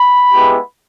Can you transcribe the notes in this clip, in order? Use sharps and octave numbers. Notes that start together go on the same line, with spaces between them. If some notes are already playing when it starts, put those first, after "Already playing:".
Already playing: B5
G#3 B3 E4 G4